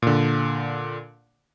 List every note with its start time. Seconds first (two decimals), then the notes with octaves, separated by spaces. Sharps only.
0.02 A#2 D3